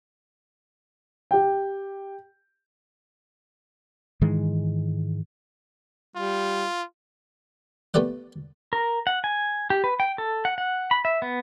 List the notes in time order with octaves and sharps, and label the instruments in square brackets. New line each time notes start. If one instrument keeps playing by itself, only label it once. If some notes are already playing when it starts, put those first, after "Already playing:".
[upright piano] G4 G5
[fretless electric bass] G#2 D#3 E3 G#3
[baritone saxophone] G3 [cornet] F4
[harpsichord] A3 B3 G4 D5 F#5
[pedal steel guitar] A#4
F#5
G#5
G4
B4
G5
A4
F#5
F#5
B5
E5
B3